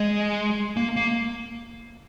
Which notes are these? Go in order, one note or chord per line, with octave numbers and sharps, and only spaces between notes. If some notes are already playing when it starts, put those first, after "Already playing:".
Already playing: G#3
A#3
A#3